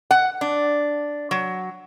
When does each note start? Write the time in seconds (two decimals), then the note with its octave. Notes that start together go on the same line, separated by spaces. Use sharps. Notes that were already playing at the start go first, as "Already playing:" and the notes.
0.11 F#5
0.41 D4
1.31 F#3